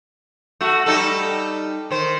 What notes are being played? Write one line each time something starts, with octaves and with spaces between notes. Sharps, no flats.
A3 F#4
G3 D#4 A4
D#3 C5